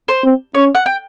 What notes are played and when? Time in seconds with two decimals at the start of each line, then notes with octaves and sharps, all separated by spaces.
0.08 C5
0.24 C4
0.55 C#4 C#5
0.75 F#5
0.86 G5